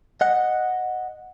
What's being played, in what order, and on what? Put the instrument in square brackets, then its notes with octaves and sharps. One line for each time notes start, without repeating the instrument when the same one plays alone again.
[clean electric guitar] D#5 F#5